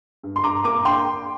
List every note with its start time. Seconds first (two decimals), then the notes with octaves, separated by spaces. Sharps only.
0.23 G2
0.36 C6
0.43 G2 A#5 D6
0.64 A#3 A#5 D6
0.85 D4 G5 C6